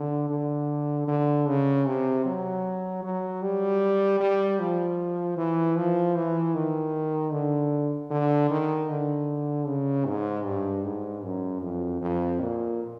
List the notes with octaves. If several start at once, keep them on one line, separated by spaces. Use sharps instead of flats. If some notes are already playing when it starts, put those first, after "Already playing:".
Already playing: D3
D3
D3
C#3
C3
F#3
F#3
G3
G3
F3
E3
F3
E3
D#3
D3
D3
D#3
D3
C#3
G#2
G2
G#2
F#2
F2
F2
A#2